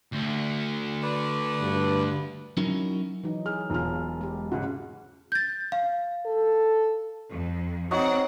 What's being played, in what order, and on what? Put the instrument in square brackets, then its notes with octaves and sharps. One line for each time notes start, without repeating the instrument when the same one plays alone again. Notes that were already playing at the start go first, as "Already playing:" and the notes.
[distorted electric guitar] D2
[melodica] B4 D5
[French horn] G2
[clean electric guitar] F#3 C#4 D#4 E4 F#4 A#4
[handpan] E3 F#3 D#4
[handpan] G#4 [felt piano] F6
[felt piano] E1 F4 F6
[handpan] G#3 G4
[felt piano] G#2 C#3 [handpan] F#5
[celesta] G6 A6
F5
[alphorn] A4
[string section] F2
[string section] C4 F#5 [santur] D#4 F#4 C#5